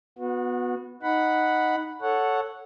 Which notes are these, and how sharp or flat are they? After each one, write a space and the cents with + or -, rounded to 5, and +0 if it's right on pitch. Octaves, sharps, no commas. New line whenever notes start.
B3 +0 F#4 -30
D#4 +0 F#5 +0 B5 +0
A4 +0 C#5 +0 F#5 -5